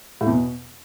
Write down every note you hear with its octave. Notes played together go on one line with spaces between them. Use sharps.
A2
E2
B2